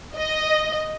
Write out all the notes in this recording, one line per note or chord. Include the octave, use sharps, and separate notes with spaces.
D#5